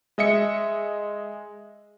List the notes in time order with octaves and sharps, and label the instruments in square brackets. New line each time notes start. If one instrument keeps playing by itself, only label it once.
[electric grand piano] G#3 D#5 E5 C#7